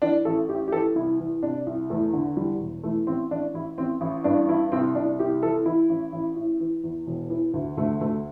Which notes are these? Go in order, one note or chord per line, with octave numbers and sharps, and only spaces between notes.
E3 D4
A1 A4
A2 G4
G4
E3 A4
C2 E4
E3
C3 D4
C2
E2 A3
D3
E2 G3
E1
E3 A3
A1 C4
A1 D4
A1 E4
A1 C4
A1 E4
G2 D4
E3 E4
C2 C4
C2 D4
C2 G4
E3 A4
E3 E4
A1
A1
A2
E3
E2
E1
E3
D2
D2 A3
D2 A3